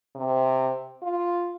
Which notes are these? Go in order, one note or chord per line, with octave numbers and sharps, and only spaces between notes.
C3
F4